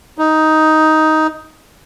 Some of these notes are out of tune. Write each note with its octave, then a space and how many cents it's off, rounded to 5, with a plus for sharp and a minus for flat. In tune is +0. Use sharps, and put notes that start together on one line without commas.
D#4 +10